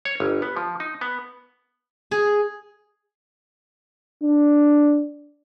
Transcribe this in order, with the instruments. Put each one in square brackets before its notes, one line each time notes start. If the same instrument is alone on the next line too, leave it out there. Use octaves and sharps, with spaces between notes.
[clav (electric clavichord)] C#5
G1
B3
F3
D#4
B3
[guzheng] G#4
[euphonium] D4